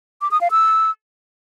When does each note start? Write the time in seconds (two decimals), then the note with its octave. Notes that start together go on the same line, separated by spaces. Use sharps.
0.21 D6
0.31 D#6
0.41 F5
0.51 E6